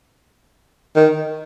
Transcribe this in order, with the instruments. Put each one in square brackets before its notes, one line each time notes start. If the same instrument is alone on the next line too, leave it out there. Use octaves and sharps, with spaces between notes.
[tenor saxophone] D#3